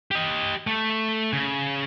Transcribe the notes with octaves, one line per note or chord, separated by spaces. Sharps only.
G4 D#5
A3
C#3